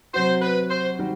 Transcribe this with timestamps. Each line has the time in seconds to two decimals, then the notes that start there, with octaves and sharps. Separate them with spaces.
0.14 C3 F#3 C4 F#4 C5
0.42 B4
0.70 C5
0.99 D#3 G3 D#4 F#4